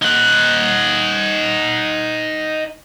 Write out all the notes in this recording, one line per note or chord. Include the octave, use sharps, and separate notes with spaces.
D#4 F#5